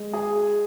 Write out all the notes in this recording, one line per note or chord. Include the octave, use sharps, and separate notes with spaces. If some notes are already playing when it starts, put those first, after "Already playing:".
Already playing: G#3
G#4